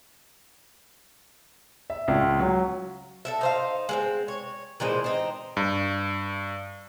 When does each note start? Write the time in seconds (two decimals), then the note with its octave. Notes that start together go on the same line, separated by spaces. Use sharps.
1.90 E5
2.08 C#2
2.39 F#3
3.25 A4 D5 E5
3.41 D#4 C5 F5
3.89 G#3 A#3 C4
4.28 C#5
4.80 A#2 E3 G#3 C5
5.04 C4 D#4
5.57 G2